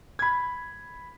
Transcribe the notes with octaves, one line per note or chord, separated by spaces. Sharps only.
B5 G#6